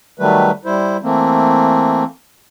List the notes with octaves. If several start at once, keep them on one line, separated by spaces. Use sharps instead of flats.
D#3 F#3 G3 A3 B4
G3 E4 C5
E3 A3 A#3 C4